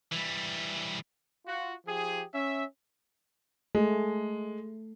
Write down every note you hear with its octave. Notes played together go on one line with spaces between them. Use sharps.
E3 G3
F4 F#4
F3 G4 G#4
C#4 E5
G#3 A3